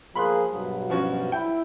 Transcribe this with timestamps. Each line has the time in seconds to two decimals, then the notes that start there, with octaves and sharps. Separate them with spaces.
0.15 F3 A#3 G#4 B5 C6 F#6
0.53 G2 B2 F#3
0.90 F3 C#4 F#4
1.32 E4 G5